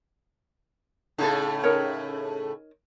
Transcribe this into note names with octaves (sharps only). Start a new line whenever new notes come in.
A2 C#3 A3 D#4 A4
D#4 A#4 C#5